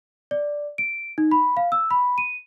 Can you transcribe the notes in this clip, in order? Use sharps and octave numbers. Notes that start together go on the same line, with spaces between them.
D5
D7
D#4
B5
F5
E6
B5
D#7